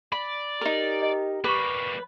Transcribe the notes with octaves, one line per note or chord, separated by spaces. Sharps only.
D5 B5
D#4 G4 A#4
D#5
G3 A#3 B4 C#6 D6